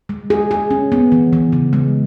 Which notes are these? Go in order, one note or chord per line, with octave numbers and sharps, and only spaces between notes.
G#3
G#4
G#4
C#4
B3
E3
E3
C#3
G#3